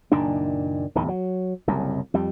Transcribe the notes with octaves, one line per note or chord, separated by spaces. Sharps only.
F#1 A#2 D#3 D4
D1 E2 D#3
F#3
F#1 C2 F#2
F2 G3